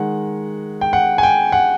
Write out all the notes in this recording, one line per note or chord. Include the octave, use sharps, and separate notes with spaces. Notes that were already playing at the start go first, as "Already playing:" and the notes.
Already playing: D#3 G#3 F#5
G5
F#5
G#5
G5
F#5